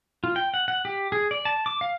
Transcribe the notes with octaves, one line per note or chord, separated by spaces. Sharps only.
F4
G5
F#5
F#5
G4
G#4
D5
A5
D6
F5